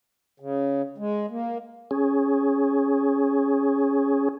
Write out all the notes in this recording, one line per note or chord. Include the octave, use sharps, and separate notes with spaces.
C#3
G#3
A#3
C#4 G#4